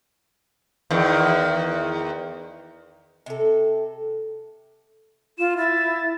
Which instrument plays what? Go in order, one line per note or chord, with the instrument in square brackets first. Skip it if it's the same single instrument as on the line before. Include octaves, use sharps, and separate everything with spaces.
[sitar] E2 D#3
[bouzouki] C3 A4
[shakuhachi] F4 [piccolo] E7
[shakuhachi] E4 [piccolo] A6